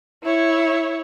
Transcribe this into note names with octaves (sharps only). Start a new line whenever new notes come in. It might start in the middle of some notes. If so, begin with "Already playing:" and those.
E4 C#5